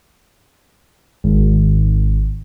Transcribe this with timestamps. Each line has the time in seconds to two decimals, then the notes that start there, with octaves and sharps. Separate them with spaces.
1.24 G#1